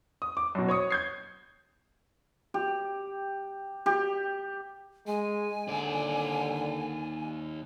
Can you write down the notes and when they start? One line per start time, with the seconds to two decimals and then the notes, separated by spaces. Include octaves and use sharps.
0.22 D#6
0.37 D6
0.55 F#2 B2
0.69 C#5 C#6 D#6 C#7
0.90 G6 G#6 C7
2.54 G4
3.86 G4
5.07 G#3 G#5
5.68 D#2 D3 D5